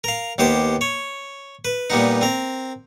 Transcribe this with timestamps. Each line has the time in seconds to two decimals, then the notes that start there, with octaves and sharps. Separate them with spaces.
0.04 A#4 F5
0.38 D#2 B3 G4 C5 D6
0.81 C#5
1.65 B4
1.90 A#2 G3 B3 D#4
2.21 C4 A#4